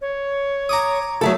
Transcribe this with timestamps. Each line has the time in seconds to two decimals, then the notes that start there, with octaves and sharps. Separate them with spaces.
0.01 C#5
0.69 A#5 D6 D#6
1.21 F#3 A3 G#4 A4